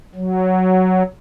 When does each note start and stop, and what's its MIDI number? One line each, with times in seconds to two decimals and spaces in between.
0.15 1.03 54